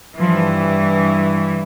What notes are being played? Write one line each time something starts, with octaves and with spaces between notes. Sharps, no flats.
G2 E3 F3